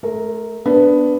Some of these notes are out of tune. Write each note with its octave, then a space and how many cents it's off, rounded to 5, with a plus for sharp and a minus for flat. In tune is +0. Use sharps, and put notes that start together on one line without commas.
A3 -30 A#4 -5
B3 +10 D4 +0